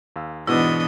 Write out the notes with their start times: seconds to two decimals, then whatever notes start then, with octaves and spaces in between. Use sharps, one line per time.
0.16 D#2 F5 E6
0.47 G#2 B2 E3 B3 D4 E4 D#5